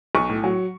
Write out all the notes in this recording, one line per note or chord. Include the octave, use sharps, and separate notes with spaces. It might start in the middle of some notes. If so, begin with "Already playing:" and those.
B1 C#6
A2
F#3